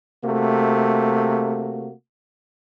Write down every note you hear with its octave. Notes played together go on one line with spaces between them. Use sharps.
C3 A3 A#3 F#4